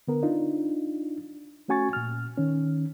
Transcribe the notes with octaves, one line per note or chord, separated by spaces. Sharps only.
D3 B3 A#4
D4 D#4 F4
A3 C#4 F#4 G#5 C#6 A6
A#2 F6
D#3 C#4